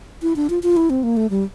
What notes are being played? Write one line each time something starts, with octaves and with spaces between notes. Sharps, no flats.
E4
D4
F4
F4
E4
C4
A#3
A3
G3